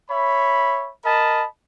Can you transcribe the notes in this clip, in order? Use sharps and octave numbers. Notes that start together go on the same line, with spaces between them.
C#5 E5 B5
A#4 D#5 A5 B5